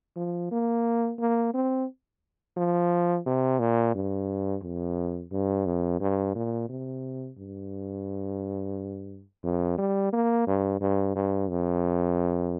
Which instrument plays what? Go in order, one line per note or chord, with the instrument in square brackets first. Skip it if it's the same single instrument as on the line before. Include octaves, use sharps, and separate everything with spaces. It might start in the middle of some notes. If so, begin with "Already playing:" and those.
[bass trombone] F3
A#3
A#3
C4
F3
C3
A#2
G2
F2
G2
F2
G2
A#2
C3
G2
F2
G3
A#3
G2
G2
G2
F2